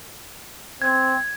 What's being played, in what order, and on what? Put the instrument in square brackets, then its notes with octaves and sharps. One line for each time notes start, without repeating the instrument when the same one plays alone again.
[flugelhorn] C4 [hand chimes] G#6